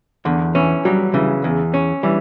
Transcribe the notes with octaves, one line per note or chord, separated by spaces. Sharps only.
E2 D3
E3 C#4
F#3 G3
C#3 E3
E2
C#4
E3 G3